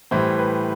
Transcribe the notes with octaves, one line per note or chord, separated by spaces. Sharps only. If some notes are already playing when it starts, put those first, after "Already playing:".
A2 E3 G3 C5
B4